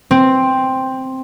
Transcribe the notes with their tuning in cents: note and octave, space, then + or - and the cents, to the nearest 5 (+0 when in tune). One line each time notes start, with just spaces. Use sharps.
C4 +5